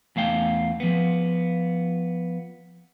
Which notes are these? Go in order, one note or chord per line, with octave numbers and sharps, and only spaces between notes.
E2 A3 F5 G5
F3 B3